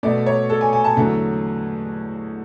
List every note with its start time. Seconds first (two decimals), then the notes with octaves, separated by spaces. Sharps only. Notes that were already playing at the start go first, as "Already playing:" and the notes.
0.03 B2 A3 D5
0.26 C#5
0.50 A4
0.61 G#5
0.73 G#5
0.84 A5
0.97 E2 D3 F#3 A3